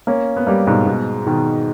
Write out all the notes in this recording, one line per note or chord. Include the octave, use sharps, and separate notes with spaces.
A#3 C#4
B3
G3 A#3
G#2 B2
G#2 B2
B2 D#3